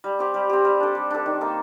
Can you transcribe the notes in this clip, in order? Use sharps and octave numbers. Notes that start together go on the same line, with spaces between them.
G3
C4 G4
G3
C4 G4
G3
D4 A4
G3
D4 A4
D#3
A#3 D#4 A4